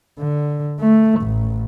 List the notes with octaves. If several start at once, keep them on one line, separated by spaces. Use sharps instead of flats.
D3
A3
A1